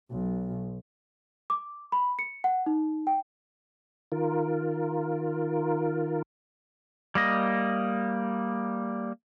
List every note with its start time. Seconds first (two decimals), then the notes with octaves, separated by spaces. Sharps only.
0.12 B1
1.50 D6
1.92 B5
2.19 C#7
2.44 F#5
2.66 D#4
3.07 G5
4.12 D#3 F4 A#4
7.15 G3 A#3 D#5